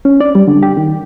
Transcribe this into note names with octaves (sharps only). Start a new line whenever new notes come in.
C#4
D5
G3
D3
G4
D#3